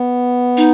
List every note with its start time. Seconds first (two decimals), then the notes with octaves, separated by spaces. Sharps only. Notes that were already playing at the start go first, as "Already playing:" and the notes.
Already playing: B3
0.57 D#4